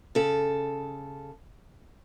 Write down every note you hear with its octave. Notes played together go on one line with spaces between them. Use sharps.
C#3 A4